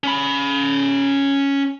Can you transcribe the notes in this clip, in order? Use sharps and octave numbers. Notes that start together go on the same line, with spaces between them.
C#4 B5